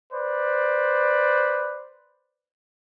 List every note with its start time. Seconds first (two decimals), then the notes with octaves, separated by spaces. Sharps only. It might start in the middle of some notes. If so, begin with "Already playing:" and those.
0.12 B4 C5 D5